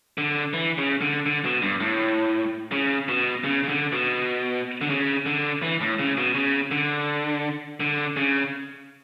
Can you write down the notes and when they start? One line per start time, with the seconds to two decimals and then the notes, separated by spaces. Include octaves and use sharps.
0.18 D3
0.53 E3
0.78 C#3
1.01 D3
1.26 D3
1.45 B2
1.62 G2
1.80 A2
2.72 C#3
3.08 B2
3.44 C#3
3.63 C#3
3.69 D3
3.92 B2
4.81 D3
4.90 C#3
5.26 D3
5.62 E3
5.81 A2
5.99 C#3
6.17 B2
6.34 C#3
6.71 D3
7.80 D3
8.17 C#3